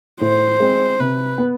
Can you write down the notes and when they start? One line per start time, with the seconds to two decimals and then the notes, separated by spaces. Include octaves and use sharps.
0.21 A2 C5
0.60 G#3 C4
1.00 C3 B4
1.38 B3